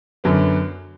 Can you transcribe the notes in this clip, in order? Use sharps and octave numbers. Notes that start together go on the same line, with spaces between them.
F#2 D3 F#3 B3